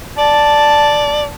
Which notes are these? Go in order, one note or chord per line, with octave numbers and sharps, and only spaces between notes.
D5 A5